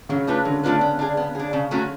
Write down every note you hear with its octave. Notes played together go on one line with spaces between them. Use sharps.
C#3 F#3
A3 D4 F4 B4
D3 F#3
A3 D4 F4 B4
B3
D4 G#4
B3
D4 G#4
C#3
F#3 A3 C#4 F#4